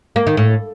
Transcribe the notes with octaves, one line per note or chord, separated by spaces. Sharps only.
A#3
D#3
A2